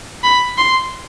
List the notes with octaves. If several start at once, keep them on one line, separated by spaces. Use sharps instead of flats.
B5
C6